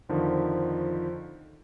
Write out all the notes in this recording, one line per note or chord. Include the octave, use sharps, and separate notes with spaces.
F2 D3 D#3 F3